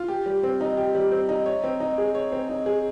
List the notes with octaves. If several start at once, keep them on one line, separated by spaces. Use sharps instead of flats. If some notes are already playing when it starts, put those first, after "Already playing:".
Already playing: F4
G4
G3
C4
D#4
G4
G3
C4
D#4
C#5
C4
D#4
G#4
C#5
C4
D#4
G#4